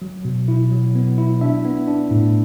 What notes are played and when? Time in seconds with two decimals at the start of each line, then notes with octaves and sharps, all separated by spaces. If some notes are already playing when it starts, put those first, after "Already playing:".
0.02 F#3
0.25 B2
0.48 E4
0.71 F#3
0.95 B3
1.18 E4
1.41 D4 E5
1.65 B3
1.87 D4
2.11 A2